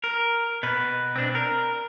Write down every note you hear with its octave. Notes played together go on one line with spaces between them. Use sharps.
A#4
B2 B4
C4 D4
A#4